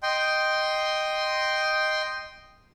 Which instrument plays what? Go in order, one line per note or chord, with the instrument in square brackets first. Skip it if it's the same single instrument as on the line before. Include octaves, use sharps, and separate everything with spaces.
[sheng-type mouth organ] D#5 G5 C6